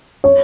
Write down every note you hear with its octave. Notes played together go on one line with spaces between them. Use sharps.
C#5